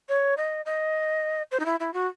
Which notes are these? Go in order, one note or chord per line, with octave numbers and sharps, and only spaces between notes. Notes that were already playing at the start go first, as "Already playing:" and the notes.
C#5
D#5
D#5
C5
D#4
E4
E4
F#4